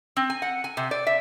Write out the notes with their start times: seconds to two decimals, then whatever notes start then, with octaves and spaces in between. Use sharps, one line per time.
0.17 C4
0.30 G#5
0.42 F#5
0.64 G#5
0.77 C3
0.91 D5
1.07 E5